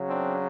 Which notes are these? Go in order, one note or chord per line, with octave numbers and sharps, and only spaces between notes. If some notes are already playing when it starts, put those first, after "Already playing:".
Already playing: C#3 F#3
C4 D4